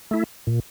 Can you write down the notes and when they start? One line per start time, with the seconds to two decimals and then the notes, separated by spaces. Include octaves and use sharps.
0.11 A3 E4
0.47 A#2